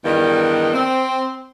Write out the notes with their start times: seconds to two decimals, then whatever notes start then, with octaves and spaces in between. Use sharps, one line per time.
0.05 E2 G2 D#3
0.73 C4